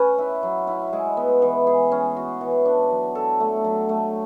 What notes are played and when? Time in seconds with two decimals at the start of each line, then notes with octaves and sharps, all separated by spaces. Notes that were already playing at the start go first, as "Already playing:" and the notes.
Already playing: C#4 B4
0.18 E4
0.43 F#3
0.67 E4
0.93 G#3
1.17 B3
1.42 E3
1.67 G#4
1.92 C#4
2.17 F#4
2.41 E3
2.65 D4
2.90 F#3
3.15 A4
3.40 A3
3.65 F#3
3.89 A3